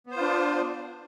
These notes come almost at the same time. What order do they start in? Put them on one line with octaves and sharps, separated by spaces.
B3 C5 F4 D4